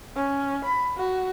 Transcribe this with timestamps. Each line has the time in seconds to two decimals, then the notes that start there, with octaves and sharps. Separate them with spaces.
0.15 C#4
0.65 B5
0.97 F#4